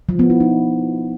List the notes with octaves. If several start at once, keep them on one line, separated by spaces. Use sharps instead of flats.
F3
B3
E4
D#4